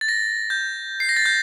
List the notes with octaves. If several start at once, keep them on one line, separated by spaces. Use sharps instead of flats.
A6
A#6
G6
C7
A#6
A6
G6